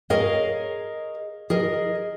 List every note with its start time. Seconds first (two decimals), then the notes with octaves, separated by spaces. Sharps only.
0.10 G#4 A#4 C#5 D#5 F5
1.50 G#4 A#4 D#5